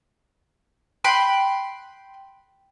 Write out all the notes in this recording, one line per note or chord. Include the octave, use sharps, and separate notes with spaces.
G5 B5 C6 F#6